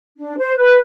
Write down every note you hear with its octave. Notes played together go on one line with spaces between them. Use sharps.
D4
C5
B4